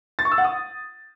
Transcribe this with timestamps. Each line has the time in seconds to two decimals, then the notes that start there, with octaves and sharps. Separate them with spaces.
0.19 A6
0.25 C#6
0.32 E6
0.38 F#5
0.44 D#6